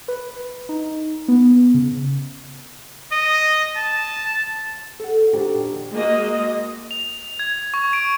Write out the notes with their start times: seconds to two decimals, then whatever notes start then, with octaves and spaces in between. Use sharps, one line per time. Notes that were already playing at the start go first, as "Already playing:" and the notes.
0.08 B4
0.69 D#4
1.28 B3
1.74 C#3
3.12 D#5
3.76 A5
4.99 A4 F#5
5.33 F2 A#2 D#3 D4 F#4 G4
5.92 G#3 A#3 F#4 D#5
6.91 F7
7.39 G#6
7.74 C#6
7.93 D7